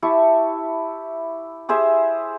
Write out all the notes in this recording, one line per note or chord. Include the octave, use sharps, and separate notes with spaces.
E4 G4 A5 C#6
G4 G#4 C5 E5